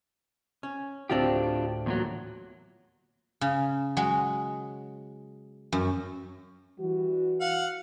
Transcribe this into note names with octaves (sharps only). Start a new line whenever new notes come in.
C#4
D2 A2 C4 D4 F4 G4
E2 A#2 F#3
C#3
F#3 G#3
F#2
E3 G3 F#4
F5 F#5